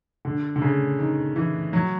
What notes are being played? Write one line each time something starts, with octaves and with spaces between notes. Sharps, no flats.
D3
D3
C#3
D#3
E3
F#3